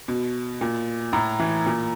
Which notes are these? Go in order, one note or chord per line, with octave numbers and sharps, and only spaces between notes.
B2
A#2
A2 A#5
E3
A#2